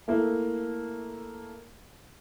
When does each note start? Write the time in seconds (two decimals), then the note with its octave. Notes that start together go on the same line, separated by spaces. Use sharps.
0.08 A3 A#3 E4